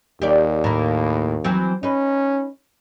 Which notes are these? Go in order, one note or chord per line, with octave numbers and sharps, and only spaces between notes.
D#2 G4 D5
A2 A#3
E3 F#3 C4
C#4 D#4 B4